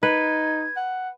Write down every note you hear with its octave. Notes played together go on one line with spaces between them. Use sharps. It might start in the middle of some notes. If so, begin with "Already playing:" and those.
D#4 B4 G#6
F#5